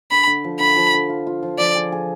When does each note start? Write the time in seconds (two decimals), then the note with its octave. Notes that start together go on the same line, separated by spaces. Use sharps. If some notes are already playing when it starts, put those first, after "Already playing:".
0.11 D3 B5
0.27 D3
0.44 F3
0.60 D3 B5
0.76 F3
0.94 D3
1.09 F4
1.27 F4
1.43 F3
1.59 F3 D5
1.75 G#4
1.92 G#4